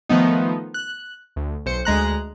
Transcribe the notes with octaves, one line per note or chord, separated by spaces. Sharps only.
D#3 F3 A3 B3 D#4
F#6
D2
B1 C5 C#7
D2 G#3 A#5 F#6